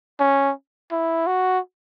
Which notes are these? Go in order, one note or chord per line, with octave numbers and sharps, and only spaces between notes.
C#4
E4
F#4